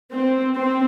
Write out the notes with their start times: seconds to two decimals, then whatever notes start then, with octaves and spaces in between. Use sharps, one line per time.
0.12 C4
0.55 C4